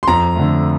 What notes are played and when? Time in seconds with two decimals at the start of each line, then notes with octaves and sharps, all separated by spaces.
0.03 C6
0.08 F2 A#5
0.36 D3 A3